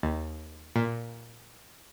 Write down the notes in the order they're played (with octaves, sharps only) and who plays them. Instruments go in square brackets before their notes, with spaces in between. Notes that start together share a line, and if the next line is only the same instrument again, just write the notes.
[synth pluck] D#2
A#2